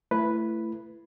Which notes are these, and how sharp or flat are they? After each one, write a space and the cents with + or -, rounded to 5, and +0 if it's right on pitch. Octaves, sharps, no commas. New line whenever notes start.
A3 +10 E4 +25 B4 +0